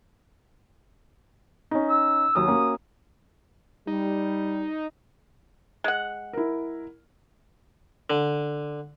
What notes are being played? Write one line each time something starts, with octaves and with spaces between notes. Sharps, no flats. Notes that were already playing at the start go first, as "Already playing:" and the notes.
C#4 D#4
E6
D#2 F#3 D#6 E6
A#3 C#4 F#4
G3 D#4
G#3 F#5
E4 A#4
D3